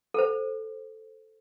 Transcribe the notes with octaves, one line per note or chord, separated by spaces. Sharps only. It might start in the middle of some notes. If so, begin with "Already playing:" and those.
A4 C5